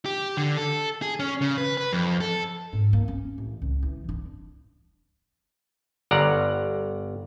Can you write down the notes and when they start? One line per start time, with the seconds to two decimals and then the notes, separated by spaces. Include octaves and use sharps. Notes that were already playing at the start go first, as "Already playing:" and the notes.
0.05 G4
0.37 D3
0.57 A4
1.02 G#4
1.20 C#4
1.42 C#3
1.58 B4
1.77 B4
1.93 F2
2.20 A4
2.73 G#2
2.93 A#3
3.08 C#4
3.38 A1
3.62 C#2
3.83 E3
4.09 D4
6.11 G1 D5 F#5 A#5